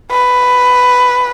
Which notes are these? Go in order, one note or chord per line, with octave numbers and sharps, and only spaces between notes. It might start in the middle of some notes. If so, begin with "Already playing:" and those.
B4